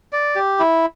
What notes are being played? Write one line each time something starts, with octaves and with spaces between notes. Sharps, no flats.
D5
G4
E4